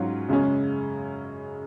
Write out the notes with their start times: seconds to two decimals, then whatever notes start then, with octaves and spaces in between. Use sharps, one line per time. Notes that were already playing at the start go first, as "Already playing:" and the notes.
Already playing: G#2 F#3 C#4 F4
0.28 F#2 C#3 G#3 C#4